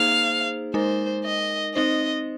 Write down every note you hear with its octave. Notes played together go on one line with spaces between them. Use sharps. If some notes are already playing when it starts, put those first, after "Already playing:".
Already playing: A#3 D#4 G#4 C5 F5
G#3 D#4 A#4 C5
D#5
C4 D#4 C5 D#5